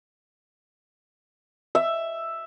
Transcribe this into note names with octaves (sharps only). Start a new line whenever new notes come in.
E5